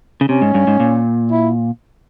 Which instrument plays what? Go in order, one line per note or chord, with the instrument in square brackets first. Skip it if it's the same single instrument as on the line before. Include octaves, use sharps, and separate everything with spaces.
[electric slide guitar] C#3
[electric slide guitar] C3 [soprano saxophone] C#4
[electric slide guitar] G#2
G2
G#2
A#2
[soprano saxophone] E4